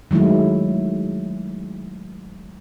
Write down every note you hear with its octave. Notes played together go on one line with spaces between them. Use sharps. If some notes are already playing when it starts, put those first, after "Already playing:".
D#3 F#3 G#3 A3 E4